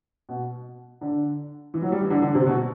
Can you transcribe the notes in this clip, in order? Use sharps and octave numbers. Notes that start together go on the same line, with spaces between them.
B2
D3
E3
F#3
G3
E3
D3
D3
C3
B2